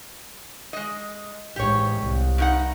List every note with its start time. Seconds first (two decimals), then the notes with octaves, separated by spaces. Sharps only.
0.73 G#3 D#5
1.56 A1 G#2 G4 C#5
2.01 C2
2.38 G2 D#4 F#5